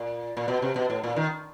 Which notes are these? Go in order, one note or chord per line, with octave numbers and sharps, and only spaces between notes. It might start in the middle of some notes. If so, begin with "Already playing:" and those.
Already playing: A#2
A#2
B2
C3
B2
A2
A#2
D#3